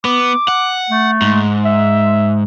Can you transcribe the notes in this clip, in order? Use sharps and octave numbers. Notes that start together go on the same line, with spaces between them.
B3 D6
F#5
A3
G#2
E5